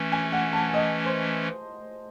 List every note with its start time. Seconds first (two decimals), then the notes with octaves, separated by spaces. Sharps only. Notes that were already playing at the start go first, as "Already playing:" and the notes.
Already playing: E3 A3 C#4
0.12 G#5
0.32 F#5
0.53 A5
0.74 D#5
1.05 C5